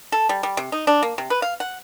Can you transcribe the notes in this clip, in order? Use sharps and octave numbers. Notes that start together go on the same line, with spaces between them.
A4
G3
G3
C3
D#4
D4
A#3
C3
B4
F5
F#5